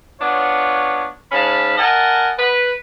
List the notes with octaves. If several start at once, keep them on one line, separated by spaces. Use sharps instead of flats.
B3 D4 F4 C#5
G#2 C#4 F5 A5 B5
A#4 D#5 F#5 G#5 A5
B4